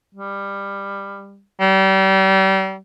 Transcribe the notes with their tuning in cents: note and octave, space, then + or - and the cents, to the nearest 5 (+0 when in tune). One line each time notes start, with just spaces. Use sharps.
G3 +20
G3 -35